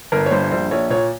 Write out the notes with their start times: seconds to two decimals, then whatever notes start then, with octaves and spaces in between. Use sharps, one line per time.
0.12 G1 A#4
0.26 C#5
0.31 G2 C5
0.51 A#1 C5
0.71 A#1 C#5
0.90 A#2 C#5